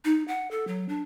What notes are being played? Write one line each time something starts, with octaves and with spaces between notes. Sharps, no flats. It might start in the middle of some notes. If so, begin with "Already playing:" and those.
D#4
F#5
A4
F#3
D4